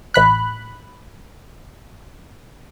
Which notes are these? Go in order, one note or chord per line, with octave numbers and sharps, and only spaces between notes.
A1 B5 F#6